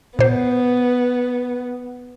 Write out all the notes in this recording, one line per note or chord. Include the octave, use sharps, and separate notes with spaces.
A#2 B3 C5